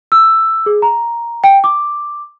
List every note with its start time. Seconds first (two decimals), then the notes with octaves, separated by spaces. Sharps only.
0.12 E6
0.66 G#4
0.82 A#5
1.44 G5
1.64 D6